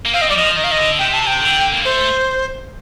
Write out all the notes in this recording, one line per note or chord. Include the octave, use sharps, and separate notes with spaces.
A#3
C4 F5
D#5
G3 D5
F3 D#5
D#3 D#5
F5
D#5
D3
C3 G5
A5
G5
D3
A#3
A3 C5